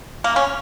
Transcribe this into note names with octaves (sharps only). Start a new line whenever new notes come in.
A#3
C#4